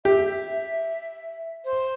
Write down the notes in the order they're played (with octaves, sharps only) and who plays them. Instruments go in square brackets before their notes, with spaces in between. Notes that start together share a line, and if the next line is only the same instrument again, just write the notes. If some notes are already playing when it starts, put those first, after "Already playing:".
[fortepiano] G4 [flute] E5
[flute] C5